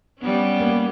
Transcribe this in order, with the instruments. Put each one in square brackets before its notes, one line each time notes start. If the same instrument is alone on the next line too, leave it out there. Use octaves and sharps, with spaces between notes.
[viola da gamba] G3 B3 C#4
[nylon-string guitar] A#3